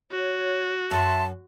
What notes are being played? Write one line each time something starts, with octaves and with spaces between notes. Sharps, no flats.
F#4 C#5
F#2 E5 A5 C6